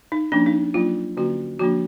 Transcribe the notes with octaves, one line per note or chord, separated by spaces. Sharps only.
D#4
F3 A#3 C#4 D4
D#4
F#3 A#3 D4 F4
D3 F#3 A#3 C#4 F#4
F3 A#3 D4 F#4